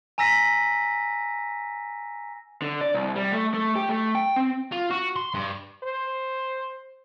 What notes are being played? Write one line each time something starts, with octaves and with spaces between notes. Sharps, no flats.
G#5 A#5 E6 A#6 B6 D#7
D3
D5
C2
G3
A3
A3
G4
A3
G5
C4
F4
F#4
C6
G2
C5